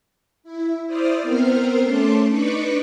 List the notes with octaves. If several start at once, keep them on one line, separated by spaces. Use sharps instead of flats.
E4
E4 C5 D5 D#6 F6
B3 C4 A#4 C5 F6 C7
A3 C#4 A5 C6 D6
D4 D#4 B4 C#6 D6 C#7